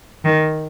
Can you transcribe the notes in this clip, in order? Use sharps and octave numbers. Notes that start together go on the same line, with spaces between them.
D#3